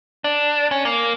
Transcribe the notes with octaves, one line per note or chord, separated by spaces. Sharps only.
D4
C#4
A#3